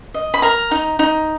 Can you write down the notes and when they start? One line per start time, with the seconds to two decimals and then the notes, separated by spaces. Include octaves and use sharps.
0.14 D#5
0.34 B5
0.42 A#4 A#5
0.71 D#4
0.99 D#4